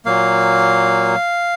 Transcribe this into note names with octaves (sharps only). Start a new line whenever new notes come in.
A#2 F#3 A#3 F5